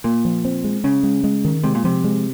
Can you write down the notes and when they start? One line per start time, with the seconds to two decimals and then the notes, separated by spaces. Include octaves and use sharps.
0.04 A#2 A#3
0.25 F3
0.45 C4
0.64 G#3
0.84 C#3 C#4
1.03 G#3
1.24 G#3
1.45 D#3
1.64 C3 G#3
1.75 A#2
1.84 C3 F3
2.04 G#3